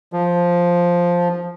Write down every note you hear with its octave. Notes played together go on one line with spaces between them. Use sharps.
F3